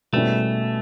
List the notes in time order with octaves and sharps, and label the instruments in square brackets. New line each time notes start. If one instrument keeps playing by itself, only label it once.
[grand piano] B2 G3 A#3 C#4 E4 [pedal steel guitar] A3